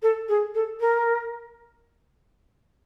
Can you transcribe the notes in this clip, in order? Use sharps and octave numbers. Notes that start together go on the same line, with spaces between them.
A4
G#4
A4
A#4